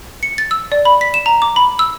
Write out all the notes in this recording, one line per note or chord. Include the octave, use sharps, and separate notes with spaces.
C#7
A6
E6
D5
B5
B6
E7
A#5
D6
B5
E6